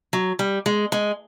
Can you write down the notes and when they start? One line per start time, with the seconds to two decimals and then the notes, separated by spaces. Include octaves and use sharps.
0.13 F#3
0.39 G3
0.66 G#3
0.92 G#3